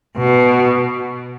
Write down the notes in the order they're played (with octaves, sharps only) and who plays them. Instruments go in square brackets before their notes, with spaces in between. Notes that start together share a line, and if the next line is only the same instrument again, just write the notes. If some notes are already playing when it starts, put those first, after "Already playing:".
[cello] B2